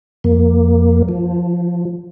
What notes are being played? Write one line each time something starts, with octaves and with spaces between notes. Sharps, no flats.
F2 A#3
F3